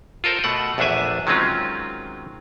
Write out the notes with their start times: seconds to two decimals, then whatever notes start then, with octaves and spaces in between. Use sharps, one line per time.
0.24 F4 A4 A#4 C5
0.44 B2 A3 F#5
0.78 A#1 E2 A3 D4 E5 G#5
1.27 D#3 F#3 G#3 C4 C#4 F4